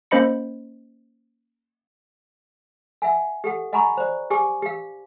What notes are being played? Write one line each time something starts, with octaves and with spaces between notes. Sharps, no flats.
A#3 C#4 C5 D#5 B5 C#7
E5 F#5 G#5
G4 A4 F#5
D#5 F#5 G#5 A#5 B5 C#6
C5 D5
G4 G#5 C#6 D6
G4 F5